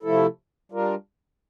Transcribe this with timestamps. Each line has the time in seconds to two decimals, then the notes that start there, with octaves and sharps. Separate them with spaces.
0.03 C3 F3 A3 E4 A4
0.72 G3 D4 F4 A#4